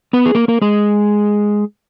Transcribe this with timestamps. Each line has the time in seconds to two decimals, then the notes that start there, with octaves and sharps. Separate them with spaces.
0.13 B3 B4
0.26 G#4
0.35 A#3 A#4
0.48 A#3 A#4
0.61 G#3 G#4